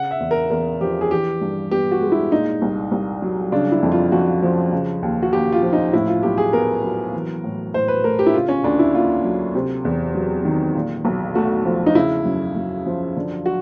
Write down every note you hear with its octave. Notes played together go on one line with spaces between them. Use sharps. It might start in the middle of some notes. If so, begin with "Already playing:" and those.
Already playing: C#3 F#5
E5
E2
A#4
E2 A#4
F3 G4
G#4
E3 G4
G2
B3 G4
F#4
G#3
E4
A#2 D#4
C2
C2
F#3
C#3 D4
E4
F2
F4
F2 F#4
F3
C#3
D#2
F#4
D#2 G4
F4
F3
D#4
A2 E4
F4
B1 G4
G#4
B3 A#4
F#3
E3
A2
A2 C5
B4
A3 A#4
G4
E4
C#3 F4
C#4
D2 D4
E4
A#3 F4
F#3
C3
E2
F#3
D#3
A#2
B1
A3 F#4
F3
D#4
C#3 E4
F#2
F#2
F3
D3
F#4